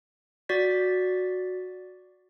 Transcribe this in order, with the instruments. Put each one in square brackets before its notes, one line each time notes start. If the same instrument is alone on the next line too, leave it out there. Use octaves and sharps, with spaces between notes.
[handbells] F#4 D5 A6 B6